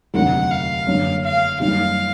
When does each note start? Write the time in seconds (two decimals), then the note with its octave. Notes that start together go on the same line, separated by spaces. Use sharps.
0.14 F1 D#2 D3 F#3 F#5
0.50 F5
0.87 F#1 F#2 D3
1.24 F5
1.59 F#1 F#2 D#3 G3 F5